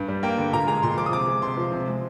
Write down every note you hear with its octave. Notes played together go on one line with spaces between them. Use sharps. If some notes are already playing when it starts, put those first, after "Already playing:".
Already playing: G2
G3
A#3 G5
D3
A#2 A#5
G#3 A#5
A#2 C6
F3 D6
D#6
C3 D6
G#3
C3 C6
F3
C3
G#3